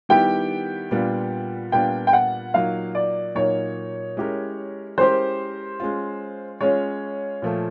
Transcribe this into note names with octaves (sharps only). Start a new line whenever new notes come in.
D#3 G3 B3 E4 G4 G5
A#2 G3 B3 D4 F4
A#2 G3 B3 D4 F4 G5
G5
F#5
A#2 F#3 A#3 D#4 F5
D5
A#2 F#3 A#3 D#4 C#5
G#3 C#4 E4 G4 A#4
G#3 C#4 E4 G4 A#4 C5
G#3 C#4 F4
G#3 C#4 F4 C#5
A#2 F3 A3